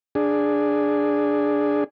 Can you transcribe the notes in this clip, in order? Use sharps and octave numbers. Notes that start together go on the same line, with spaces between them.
D4 G#4